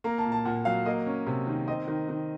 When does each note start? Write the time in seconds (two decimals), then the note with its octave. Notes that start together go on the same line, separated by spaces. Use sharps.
0.04 A#3 A#5
0.18 A5
0.25 A#2
0.32 A5
0.45 A#2 F#5
0.65 F#3 F5
0.86 A#3 D#5
1.07 C#4
1.26 C3
1.47 D#3
1.67 C4 D#5
1.88 D#3
2.09 D#3